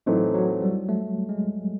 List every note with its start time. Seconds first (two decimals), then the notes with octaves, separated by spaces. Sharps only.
0.06 A2 E3 F#3 A3 C4 D#4
0.34 F#3
0.62 G3
0.89 A3
1.29 G#3